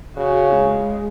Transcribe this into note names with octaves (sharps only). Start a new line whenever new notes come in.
C#3 F#4
G#3